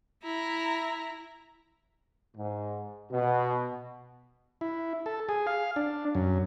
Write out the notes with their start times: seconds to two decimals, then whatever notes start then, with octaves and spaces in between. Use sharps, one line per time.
0.23 E4 A#5
2.36 G#2
3.11 B2
4.61 E4
5.06 A4
5.29 G#4
5.47 F5
5.76 D4
6.15 F#2